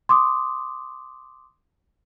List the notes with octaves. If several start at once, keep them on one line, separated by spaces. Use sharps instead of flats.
C6 D6 D#6